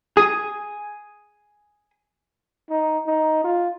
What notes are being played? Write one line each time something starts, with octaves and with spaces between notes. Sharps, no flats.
G#4 D#6
D#4
D#4
F4